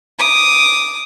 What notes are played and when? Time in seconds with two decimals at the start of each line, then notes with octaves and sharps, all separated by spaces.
0.19 D6 D#6